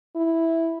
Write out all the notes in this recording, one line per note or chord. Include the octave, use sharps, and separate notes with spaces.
E4